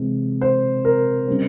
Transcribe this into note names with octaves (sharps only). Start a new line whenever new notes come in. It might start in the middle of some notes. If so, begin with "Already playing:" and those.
Already playing: C3 E3 G#3
C5
A#4
C#3 G3 C4